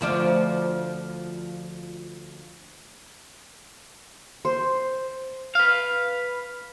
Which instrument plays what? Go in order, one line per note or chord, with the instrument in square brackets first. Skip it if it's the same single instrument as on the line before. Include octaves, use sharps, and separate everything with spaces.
[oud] D2 F3 D4
[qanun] C5
[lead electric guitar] B4 F5